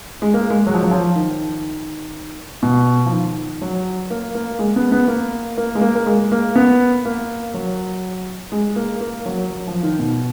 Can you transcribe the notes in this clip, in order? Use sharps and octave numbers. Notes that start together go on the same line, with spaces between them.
G#3
A#3
G#3
F#3
F3
F#3
F3
D#3
B2
F3
D#3
F#3
A#3
A#3
G#3
B3
B3
A#3
A#3
G#3
A#3
A#3
G#3
A#3
B3
A#3
F#3
G#3
A#3
A#3
F#3
F#3
F3
D#3
B2